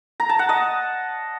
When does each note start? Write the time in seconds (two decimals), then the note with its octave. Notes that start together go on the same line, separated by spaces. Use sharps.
0.20 A#5
0.29 A5
0.39 F#5
0.49 D#5